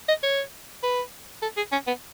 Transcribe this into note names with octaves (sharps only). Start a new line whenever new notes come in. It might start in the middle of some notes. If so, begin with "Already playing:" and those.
D#5
C#5
B4
A4
G#4
C#4
B3